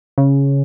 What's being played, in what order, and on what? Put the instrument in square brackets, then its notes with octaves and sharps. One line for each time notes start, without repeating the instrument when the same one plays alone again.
[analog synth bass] C#3